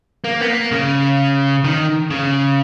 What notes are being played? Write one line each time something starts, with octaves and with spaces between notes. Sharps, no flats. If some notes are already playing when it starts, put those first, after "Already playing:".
A#3
B3
A#3
C#3
D#3
C#3